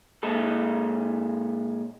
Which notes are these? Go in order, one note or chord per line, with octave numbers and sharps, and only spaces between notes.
A#2 G#3 A4